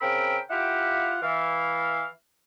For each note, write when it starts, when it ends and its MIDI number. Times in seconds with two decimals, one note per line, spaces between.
0.01 0.37 49
0.01 0.37 60
0.01 0.37 70
0.01 0.37 79
0.01 0.37 83
0.01 0.37 88
0.50 1.17 64
0.50 1.17 65
0.50 1.17 67
0.50 1.17 77
0.50 1.17 78
1.22 2.05 52
1.22 2.05 77